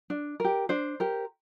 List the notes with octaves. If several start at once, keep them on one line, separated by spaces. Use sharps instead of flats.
D4
G4 A#4
D4 C5
G4 A#4